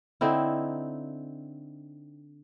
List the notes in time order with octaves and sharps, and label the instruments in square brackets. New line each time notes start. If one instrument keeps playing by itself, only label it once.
[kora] D3 C4 D#4 E4